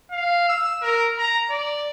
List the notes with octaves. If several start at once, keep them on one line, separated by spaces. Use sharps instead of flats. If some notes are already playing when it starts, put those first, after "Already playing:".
F5
E6
A#4
A#5
D5